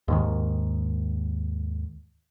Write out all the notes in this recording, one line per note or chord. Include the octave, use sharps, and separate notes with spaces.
D#2 G#2 D#3